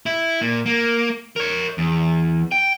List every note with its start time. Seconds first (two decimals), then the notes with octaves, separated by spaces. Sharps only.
0.06 E4
0.41 A#2
0.66 A#3
1.36 A#4 C#5
1.78 E2
2.52 G5